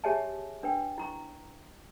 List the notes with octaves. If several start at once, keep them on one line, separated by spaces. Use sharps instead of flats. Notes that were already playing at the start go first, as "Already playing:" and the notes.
G4 G#4 C#5 E5 G#5 A5
D4 B4 G5
E4 A#5 C#6